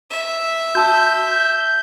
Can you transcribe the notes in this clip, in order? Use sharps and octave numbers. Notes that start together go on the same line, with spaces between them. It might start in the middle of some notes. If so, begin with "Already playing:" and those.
E5
F#4 A5 E6 G6